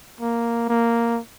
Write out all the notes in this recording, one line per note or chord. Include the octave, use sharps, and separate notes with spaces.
A#3
A#3